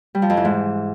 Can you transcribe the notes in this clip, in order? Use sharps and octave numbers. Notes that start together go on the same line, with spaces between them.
G3
F3
F2
E3
G#2